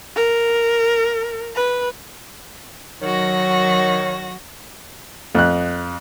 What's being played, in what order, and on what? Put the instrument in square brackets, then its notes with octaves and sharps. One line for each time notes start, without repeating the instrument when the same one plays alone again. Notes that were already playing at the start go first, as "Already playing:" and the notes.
[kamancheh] A#4
B4
[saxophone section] D#3 C#5 [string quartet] F#3 F#4 A#6
[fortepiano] F2 F#6